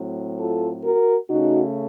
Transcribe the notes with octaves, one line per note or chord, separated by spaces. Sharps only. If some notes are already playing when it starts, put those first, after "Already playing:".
Already playing: A2 F#3 C4
F4 A4
F#4 A#4
C#3 A3 C#4 D#4 F#4